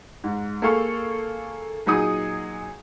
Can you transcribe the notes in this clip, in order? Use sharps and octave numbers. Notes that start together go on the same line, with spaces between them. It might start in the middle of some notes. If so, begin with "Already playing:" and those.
G#2
A#3 G#4 A4 F5 C#6
A#2 F#3 D#4 G#4 D#6